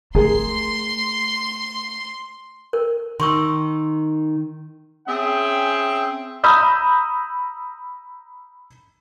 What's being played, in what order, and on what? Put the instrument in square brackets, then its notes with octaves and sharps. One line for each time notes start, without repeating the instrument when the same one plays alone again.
[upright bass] A3 [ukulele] G#4 A#4 [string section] C6
[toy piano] A#4
[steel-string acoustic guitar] D#3 [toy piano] C6 C#6 E6
[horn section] C4 C#4 G#4 E5 G5
[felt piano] A#5 B5 D#6 E6 G6